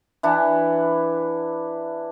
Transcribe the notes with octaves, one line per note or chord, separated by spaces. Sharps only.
E3 D4 E4 F#5